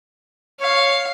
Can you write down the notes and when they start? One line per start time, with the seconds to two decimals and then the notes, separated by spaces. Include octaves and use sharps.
0.60 C#5 F5